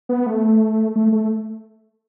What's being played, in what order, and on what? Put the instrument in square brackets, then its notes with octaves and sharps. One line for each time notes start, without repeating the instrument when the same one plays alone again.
[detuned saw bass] B3
A3
A3
A3